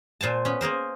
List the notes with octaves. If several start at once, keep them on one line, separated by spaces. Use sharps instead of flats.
A#2 C5 G#5 A5
B3 C#4
A#3 G#4 A#4 C5